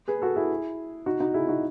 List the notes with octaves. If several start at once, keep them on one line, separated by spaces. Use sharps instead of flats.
G#4 B4
F#4 A4
E4 G#4
D#4 F#4
D#4 F#4
E4 G#4
D#4 F#4